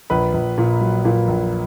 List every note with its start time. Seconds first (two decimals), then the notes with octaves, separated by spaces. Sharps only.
0.10 A#1 B4 B5
0.34 A#1
0.58 A#2
0.81 F#3
1.05 A#2
1.28 A#1